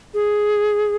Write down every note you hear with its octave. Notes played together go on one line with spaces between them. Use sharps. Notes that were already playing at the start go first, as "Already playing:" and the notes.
G#4